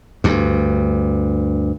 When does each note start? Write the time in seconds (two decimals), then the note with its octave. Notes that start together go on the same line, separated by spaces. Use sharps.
0.24 D2 G2